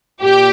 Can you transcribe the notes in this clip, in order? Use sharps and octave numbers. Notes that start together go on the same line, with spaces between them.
A#2 G4